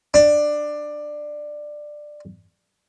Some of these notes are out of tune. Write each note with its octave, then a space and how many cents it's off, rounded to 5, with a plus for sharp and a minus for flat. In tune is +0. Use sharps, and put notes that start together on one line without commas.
D4 +15